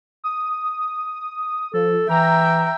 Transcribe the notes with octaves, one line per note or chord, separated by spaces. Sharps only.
D#6
F3 A4
E3 E5 G5 A#5